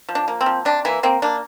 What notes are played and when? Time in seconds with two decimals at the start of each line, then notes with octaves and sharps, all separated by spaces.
0.09 F3
0.15 D4
0.28 A#3
0.41 C4
0.46 F3
0.65 C3 D4
0.85 E3 A#3 E4
1.03 A#3 C4
1.22 A#3 D4